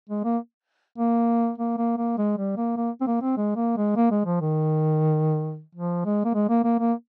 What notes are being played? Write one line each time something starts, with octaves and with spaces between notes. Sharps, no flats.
G#3
A#3
A#3
A#3
A#3
A#3
G#3
G3
A#3
A#3
C4
A#3
C4
G#3
A#3
G#3
A#3
G#3
F3
D#3
F3
G#3
A#3
G#3
A#3
A#3
A#3